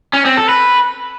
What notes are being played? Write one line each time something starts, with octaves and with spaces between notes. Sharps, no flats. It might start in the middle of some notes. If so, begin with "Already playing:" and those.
C#4
C4
A4
B4